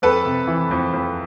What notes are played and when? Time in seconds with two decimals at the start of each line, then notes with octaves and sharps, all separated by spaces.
0.02 F2 A4 B4
0.25 C3
0.47 E3
0.71 F2
0.93 F2